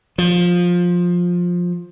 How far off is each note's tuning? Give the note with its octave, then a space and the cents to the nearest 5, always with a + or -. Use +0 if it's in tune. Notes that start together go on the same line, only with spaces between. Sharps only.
F3 +15